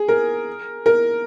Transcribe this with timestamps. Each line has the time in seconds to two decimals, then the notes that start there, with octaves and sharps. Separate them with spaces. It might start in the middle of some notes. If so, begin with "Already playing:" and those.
Already playing: G#4
0.08 A#4
0.86 A#4